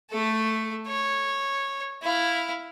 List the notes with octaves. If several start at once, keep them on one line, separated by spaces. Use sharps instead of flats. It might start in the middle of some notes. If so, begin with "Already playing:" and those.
A3 A4
C#5
E4 F5